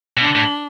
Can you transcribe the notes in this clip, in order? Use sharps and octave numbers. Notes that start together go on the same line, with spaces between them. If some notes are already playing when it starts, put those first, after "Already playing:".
B2
D3 D4
A2